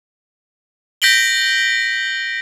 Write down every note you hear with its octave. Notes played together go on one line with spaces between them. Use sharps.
G6 A#6 B6 D7 F#7 G7